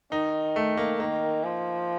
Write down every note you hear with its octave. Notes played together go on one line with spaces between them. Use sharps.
D#3 D#4
A3
A#3
D#3 A#3
F3